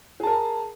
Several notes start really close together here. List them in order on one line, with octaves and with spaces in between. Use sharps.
G#4 A5 A#4